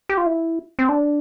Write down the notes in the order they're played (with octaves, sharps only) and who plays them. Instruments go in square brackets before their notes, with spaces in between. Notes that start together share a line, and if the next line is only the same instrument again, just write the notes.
[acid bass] G4
F4
E4
C4
D4